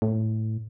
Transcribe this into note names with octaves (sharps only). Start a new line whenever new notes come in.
A2